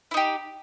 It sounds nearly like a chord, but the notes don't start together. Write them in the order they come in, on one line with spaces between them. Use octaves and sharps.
E4 D#4 G4